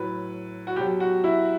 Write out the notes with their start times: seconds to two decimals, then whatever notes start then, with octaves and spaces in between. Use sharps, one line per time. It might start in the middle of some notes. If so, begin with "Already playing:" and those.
Already playing: A2 F#3 B4
0.67 F#4
0.76 B2 F#3 G4
1.00 F#4
1.24 E4